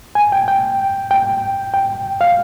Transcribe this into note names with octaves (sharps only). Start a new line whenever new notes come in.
G#5
G5
G5
G5
G5
F5